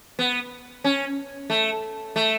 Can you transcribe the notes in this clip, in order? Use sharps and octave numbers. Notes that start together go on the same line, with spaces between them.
B3
C#4
A3
A3